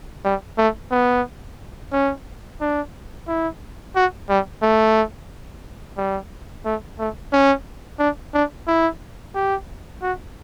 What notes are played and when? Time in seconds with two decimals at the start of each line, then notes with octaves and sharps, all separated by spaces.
0.25 G3
0.58 A3
0.91 B3
1.92 C#4
2.61 D4
3.28 E4
3.96 F#4
4.29 G3
4.62 A3
5.97 G3
6.65 A3
6.99 A3
7.32 C#4
7.99 D4
8.34 D4
8.67 E4
9.35 G4
10.02 F#4